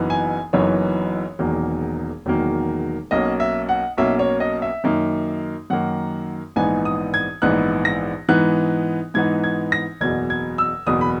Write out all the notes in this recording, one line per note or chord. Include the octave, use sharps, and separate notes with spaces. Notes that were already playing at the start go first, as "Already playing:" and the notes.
Already playing: F#1 F#2 E3 B3 D#4
G#5
F#1 F#2 E3 B3 D#4 C#5
E1 E2 D#3 F#3 A#3
E1 E2 D#3 F#3 A#3
B1 B2 A#3 C#4 D#5
E5
F#5
B1 B2 A#3 C#4 E5
C#5
D#5
E5
F#2 D#3 A#3 D#4
F#2 D#3 A#3 D#4 F#5
A#1 G#2 E3 B3 D#4 G#5
D#6
G#6
A#1 G#2 E3 B3 D#4 F#6
A#6
G#2 E3 B3 D#4 F#6
G#2 E3 B3 D#4 G#6
G#6
A#6
F#1 E2 B2 G#6
G#6
E6
F#1 E2 B2 D#6
B5